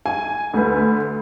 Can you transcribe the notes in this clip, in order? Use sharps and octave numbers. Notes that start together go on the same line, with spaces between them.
G#5
D2 B4